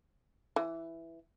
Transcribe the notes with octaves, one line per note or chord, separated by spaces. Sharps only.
E3